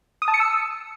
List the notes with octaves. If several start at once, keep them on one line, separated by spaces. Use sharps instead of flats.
D#6
A5
C#7
E6